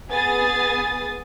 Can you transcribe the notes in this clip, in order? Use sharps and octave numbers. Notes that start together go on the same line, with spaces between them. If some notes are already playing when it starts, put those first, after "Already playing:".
B3 G#4 G#5 D#6 A6